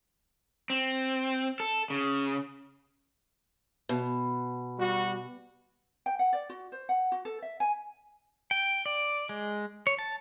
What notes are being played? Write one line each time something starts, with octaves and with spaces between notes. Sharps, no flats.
C4
A4
C#3
B2
G3 F#4
G5
F#5
D5
F#4
C5
F#5
F#4
A4
E5
G#5
G5
D5
G#3
C#5
A5